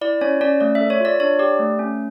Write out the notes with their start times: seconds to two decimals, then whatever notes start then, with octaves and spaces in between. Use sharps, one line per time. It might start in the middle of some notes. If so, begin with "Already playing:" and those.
0.01 E4 D5
0.21 C#4 C#5
0.41 C#4 D5
0.60 A3 D5
0.75 E5
0.81 A4
0.90 C#5
1.00 F4 D5
1.20 D4 C#5
1.39 G4 D5
1.59 A3
1.79 C#4